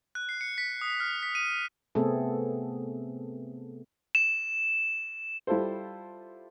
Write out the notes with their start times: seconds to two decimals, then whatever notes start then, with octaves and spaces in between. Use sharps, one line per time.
0.15 F#6
0.29 C7
0.41 C#7
0.58 B6
0.81 D#6
1.00 F6
1.23 B6
1.35 D#7
1.95 C3 A3 B3 C4 G#4 A4
4.15 E7
5.47 G3 E4 F4 A4 C5